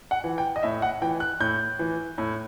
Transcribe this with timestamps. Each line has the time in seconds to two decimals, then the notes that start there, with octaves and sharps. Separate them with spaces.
0.11 F#5
0.24 E3
0.38 G5
0.56 D#5
0.63 A2 E5
0.82 F#5
1.02 E3 G5
1.20 F#6
1.40 A2 G6
1.79 E3
2.18 A2